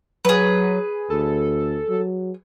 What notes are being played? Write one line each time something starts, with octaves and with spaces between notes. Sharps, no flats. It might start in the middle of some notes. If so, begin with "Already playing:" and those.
F#3 G#4 B4
D2 A4
F#3